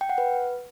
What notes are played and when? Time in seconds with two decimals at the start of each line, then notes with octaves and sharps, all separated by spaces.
0.01 G5
0.09 F#5
0.18 B4